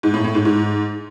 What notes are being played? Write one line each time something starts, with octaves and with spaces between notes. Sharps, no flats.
G#2
A2
A2
G#2
G#2